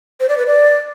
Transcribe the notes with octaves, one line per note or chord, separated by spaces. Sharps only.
C5
D5
B4
D5